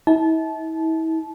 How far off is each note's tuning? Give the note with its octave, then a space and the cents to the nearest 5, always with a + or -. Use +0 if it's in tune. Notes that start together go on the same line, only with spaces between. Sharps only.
E4 -40 A5 -25